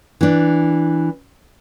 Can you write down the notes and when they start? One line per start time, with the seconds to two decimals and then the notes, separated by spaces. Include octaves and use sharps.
0.21 E3 D4